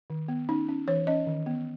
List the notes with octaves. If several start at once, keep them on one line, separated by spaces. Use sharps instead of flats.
D#3
B3
C#4 D#4
C#4
E3 C#5
C#4 D#5
D#3
B3